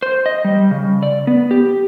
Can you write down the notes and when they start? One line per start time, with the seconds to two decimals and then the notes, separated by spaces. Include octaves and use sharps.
0.02 C5
0.26 D#5
0.45 G3
0.71 C#3
1.03 D5
1.27 B3
1.51 G4